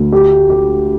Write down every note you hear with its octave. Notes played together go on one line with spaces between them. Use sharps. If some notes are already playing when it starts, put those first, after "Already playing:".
Already playing: D2
G4
G4